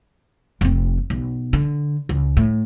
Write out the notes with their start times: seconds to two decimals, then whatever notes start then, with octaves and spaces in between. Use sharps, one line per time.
0.61 F1 C4
1.10 B1
1.53 D3
2.09 C#2
2.37 A2